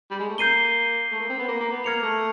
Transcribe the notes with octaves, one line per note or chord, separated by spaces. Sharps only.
G3
G#3
A3
A#3 G6 C7 D#7 G7
A3
A#3
C4
B3
A#3
A#3
B3
A#3 F6 G#6 C#7 F7
A3